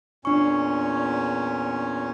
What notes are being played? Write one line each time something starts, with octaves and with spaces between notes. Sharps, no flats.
E2 A#2 C#4 D4 C#6